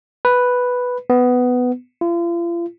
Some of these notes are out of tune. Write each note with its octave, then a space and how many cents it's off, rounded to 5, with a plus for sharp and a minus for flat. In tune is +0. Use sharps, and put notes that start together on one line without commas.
B4 +0
B3 +10
F4 -40